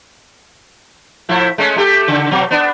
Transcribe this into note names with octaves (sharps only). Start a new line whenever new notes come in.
A2 F3 E4
G#3 A3 C#4
A3 G4 A4
C#3
B2 F#3
B3 D4